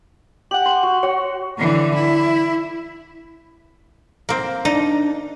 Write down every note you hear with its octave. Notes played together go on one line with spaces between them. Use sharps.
G4 F#5 F#7
C6
F#4
F#4 C#5
D3 E3
E4
A#3 C4
D4 D#4